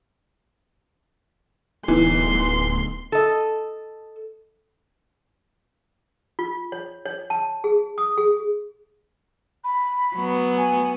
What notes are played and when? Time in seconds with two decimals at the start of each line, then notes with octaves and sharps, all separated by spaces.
1.88 D1 E3 B3 D#4 C6
3.12 A4 D#5
6.39 F4
6.72 C#5
7.06 C#5
7.30 A5
7.64 G#4
7.98 D#6
8.18 G#4
9.64 B5
10.15 F#3 B3
10.57 G#5